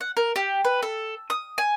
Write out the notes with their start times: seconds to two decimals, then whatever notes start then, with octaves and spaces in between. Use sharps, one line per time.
0.01 F#5
0.17 A#4
0.36 G4
0.65 B4
0.83 A4
1.30 D#6
1.58 G#5